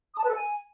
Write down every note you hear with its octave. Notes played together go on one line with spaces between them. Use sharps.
D#6
A5
B4
A4
G#5